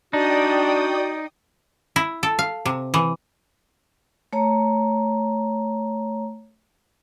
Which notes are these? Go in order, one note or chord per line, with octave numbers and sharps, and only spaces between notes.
D4 D#4 F#4 D5 G5 D#6
E4
A4
F5
C3
E3
A3 C#5 A#5